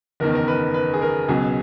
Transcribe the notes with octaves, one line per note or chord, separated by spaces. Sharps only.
F#1 E2 D#3 A#4
A#4
B4
B4
G#4
A#4
C#2 B2 F#3 G#4